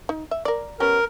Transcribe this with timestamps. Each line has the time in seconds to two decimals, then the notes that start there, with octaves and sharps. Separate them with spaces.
0.09 D#4
0.31 E5
0.45 A#4 D5
0.80 G3 B3 C#4 A#4